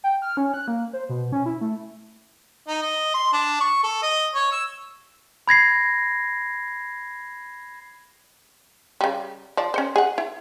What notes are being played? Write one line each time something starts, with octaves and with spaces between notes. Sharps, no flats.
G5
F6
C#4
F#6
A#3
C5
B2
C#4
E4
A3
D#4
D#5
C6
D4
C#6
A4
D#5
C#5
E6
B5 G#6 A#6 C7
C#3 G3
F3 D5
C#4 C5
G#4 F#5
E4